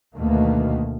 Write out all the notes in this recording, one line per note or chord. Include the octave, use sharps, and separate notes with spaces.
D2 B2 D#3 A3 A#3